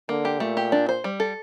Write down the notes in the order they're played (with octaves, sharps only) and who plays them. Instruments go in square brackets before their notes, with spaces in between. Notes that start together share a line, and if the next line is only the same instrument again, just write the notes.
[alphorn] D3 [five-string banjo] A#3
[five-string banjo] G4
[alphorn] A#2 [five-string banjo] A3
[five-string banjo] G4
D4
C5
G3
A4